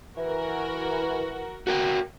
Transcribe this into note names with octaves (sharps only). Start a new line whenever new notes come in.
E3 F#4 A#4
F#4 A#4 G5